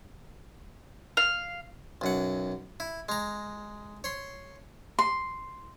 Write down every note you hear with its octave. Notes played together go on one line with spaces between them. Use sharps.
F5
B1 F#2 F#5
E4
G#3 A#5
C#5 C6
C6